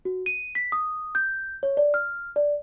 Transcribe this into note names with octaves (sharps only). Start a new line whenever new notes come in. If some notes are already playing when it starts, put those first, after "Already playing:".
F#4
D#7
B6
D#6
G6
C#5
D5
F6
D5